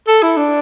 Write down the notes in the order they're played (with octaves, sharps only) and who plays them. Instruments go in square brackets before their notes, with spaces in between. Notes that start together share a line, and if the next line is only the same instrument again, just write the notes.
[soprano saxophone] A4
E4
D4